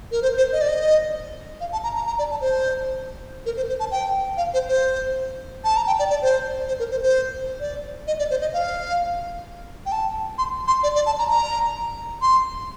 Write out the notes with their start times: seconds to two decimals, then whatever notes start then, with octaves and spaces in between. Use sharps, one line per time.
0.11 A#4
0.22 C5
0.37 C5
0.53 D#5
0.61 D5
0.68 D#5
1.61 F5
1.72 A5
1.84 A#5
1.96 A#5
2.07 A#5
2.19 D5
2.31 A5
2.41 C5
3.46 A#4
3.57 C5
3.69 C5
3.80 A5
3.91 G5
4.37 F5
4.54 C5
4.68 C5
5.64 A5
5.77 A#5
5.87 G5
5.99 D5
6.10 D5
6.22 C5
6.68 C5
6.79 A#4
6.91 C5
7.03 C5
7.60 D5
8.07 D#5
8.19 D5
8.30 C5
8.41 D#5
8.53 F5
9.86 G5
9.92 A5
10.38 C6
10.68 C6
10.83 D5
10.95 D5
11.06 A5
11.19 A#5
11.30 A#5
12.22 C6